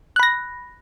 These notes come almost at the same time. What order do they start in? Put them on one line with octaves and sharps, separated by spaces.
F#6 B5 A#6